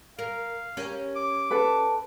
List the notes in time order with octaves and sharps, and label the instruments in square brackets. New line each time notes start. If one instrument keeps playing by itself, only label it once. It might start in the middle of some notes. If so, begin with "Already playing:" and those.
[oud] A#4 [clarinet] F5
[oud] C#4 G4 A#4
[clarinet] D6
[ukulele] A4 B4